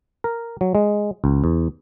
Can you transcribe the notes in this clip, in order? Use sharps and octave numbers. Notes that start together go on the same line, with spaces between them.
A#4
F#3
G#3
C#2
E2